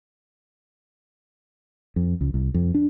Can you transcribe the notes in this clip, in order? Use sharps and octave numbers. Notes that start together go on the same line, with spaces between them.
F2
C#2
C2
F2
D4